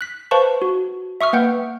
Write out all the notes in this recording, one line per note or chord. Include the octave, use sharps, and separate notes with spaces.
F#6 B6
B4 C5 F5 A5 C#6
F#4
E5 C#6 D#6 F6
A#3 B4 F#5 G5 G6